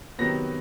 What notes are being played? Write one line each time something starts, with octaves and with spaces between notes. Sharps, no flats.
C3 D#3 F#3 B3 A#6